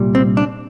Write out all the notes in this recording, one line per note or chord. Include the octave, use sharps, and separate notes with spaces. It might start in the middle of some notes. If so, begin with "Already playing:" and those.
Already playing: C2 A#2 G3
C4
D4